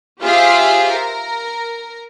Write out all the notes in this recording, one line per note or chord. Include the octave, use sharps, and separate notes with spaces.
F4 G4 G#4 C5 E5 F5
A#4